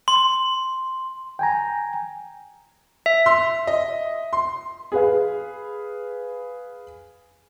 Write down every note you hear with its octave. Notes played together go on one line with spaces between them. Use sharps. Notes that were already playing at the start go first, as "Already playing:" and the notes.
C6
G5 G#5 A#5
E5
C6 E6
D#5
C6
G#4 B4 F5